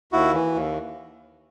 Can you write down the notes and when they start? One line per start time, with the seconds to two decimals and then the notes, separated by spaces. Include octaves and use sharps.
0.12 D#2 E4 F#4
0.34 E3
0.54 D#2